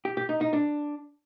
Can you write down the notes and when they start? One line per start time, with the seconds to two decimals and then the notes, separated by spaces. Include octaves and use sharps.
0.05 G4
0.17 G4
0.29 D#4
0.41 D#4
0.53 D4